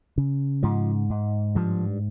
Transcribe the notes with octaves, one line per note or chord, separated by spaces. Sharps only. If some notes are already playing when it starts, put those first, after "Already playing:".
C#3
G#2 F3
G#2
G2 F3